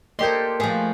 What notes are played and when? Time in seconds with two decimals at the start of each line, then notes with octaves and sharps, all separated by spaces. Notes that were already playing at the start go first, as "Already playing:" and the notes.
0.19 A#3 G4 A4 A#4 C5 D5 D#5 C6
0.60 F3 A3 G#4 B4